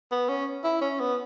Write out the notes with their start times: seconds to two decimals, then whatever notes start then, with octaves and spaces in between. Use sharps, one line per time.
0.12 B3
0.29 C#4
0.64 E4
0.81 C#4
0.99 B3